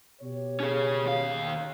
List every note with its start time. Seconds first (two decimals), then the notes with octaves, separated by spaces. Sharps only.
0.21 B2 G4 C#5
0.60 C#4 G#4
1.05 D#2 F5